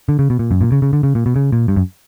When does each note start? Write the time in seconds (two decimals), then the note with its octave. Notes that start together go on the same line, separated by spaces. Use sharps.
0.09 D3
0.19 C#3
0.30 B2
0.39 A#2
0.51 F#2
0.61 A#2
0.72 C#3
0.82 C#3
0.93 D3
1.03 C#3
1.15 A#2
1.26 B2
1.36 C#3
1.52 A#2
1.68 G2
1.76 F#2